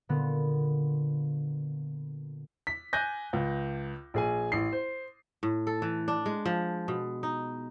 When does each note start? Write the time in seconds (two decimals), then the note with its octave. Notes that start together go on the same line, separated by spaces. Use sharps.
0.09 A#2 D3 B3
2.67 B6
2.93 G#5 F#6 G6 A#6
3.33 C#2
4.14 A#1 G#4 G#5
4.52 A1 C7
4.73 C5
5.43 A2
5.67 A4
5.82 E3
6.08 D4
6.26 G#3
6.46 F3
6.88 B2
7.23 D#4